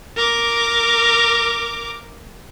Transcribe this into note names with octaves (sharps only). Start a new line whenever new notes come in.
A#4 D6